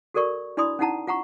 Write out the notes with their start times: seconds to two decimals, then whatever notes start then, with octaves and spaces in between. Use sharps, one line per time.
0.14 F#4 A4 A#4 D5 C#6
0.57 D4 E4 D5 B5 C6 D#6
0.79 C#4 D#4 E4 F#5 A5 A#5
1.07 F4 F#5 A#5 C#6